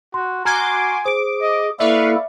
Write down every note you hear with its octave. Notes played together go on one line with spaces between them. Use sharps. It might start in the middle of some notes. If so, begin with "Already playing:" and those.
F#4 C6
F#4 G#5 A#5 C6 D6 F6 G#6
G#4 C5 D6 D7
D#5
A#3 E4 A4 B4 D5 E5 F5 C#6